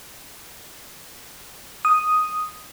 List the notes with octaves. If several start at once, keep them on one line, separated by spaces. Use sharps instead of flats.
D#6